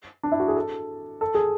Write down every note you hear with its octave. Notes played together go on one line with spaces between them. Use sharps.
D4
E4
F#4
G#4
A4
A4
G#4